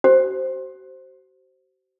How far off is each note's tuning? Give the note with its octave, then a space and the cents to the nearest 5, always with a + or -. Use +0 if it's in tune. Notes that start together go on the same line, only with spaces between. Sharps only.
F#4 +40 C5 +0